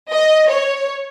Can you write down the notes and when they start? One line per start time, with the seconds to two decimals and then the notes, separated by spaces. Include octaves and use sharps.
0.10 D#5
0.49 C#5